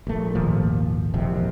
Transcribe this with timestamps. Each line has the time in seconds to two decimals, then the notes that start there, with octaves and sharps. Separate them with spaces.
0.07 A#1 A3
0.35 G#1 D#2 A#2 F3
1.14 E1 A#1 F2 C3